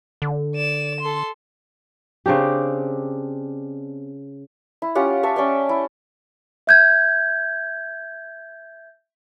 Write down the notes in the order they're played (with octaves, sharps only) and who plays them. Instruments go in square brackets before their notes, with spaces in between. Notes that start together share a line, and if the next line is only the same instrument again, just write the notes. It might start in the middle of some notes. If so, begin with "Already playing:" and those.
[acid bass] D3
[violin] D5 E7
A4 C6
[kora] C#3 C4 D4 G4
[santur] E4
C#4 F4 G4 F#5
C#5 E5 A5
C#4 D5 E5 G5
E4
[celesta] E5 G6 G#6